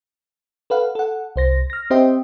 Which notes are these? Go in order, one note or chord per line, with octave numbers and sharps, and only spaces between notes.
A4 B4 F5 F#5
A4 F#5
C2 C5 A#6
F6 A#6
C4 G4 C5 D#5 E5 G5